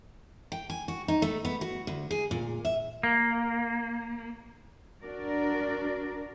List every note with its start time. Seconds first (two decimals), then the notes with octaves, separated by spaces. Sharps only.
0.52 G5
0.70 G#5
0.88 F#4
1.08 D#4
1.22 A3
1.45 B3
1.61 F#4
1.87 D2
2.11 G#4
2.31 A#2
2.65 E5
3.03 A#3
5.02 D4 F#4 A#4 D5